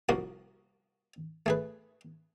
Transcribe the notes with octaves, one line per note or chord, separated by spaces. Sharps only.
C2 F3 A#3 F#4 D#6
A3 G#4 B4